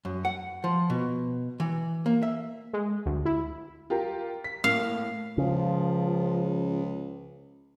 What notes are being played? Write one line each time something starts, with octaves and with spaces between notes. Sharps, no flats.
F#2
F#5
F3
B2
E3
A#3
E5
G#3
D2
E4
F4 G4 A#4
B6
A2 A#3 F5
C#2 C#3 F3